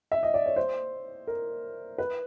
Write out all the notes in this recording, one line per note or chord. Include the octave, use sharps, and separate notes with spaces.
E5
D#5
D5
C#5
C5
A#4
B4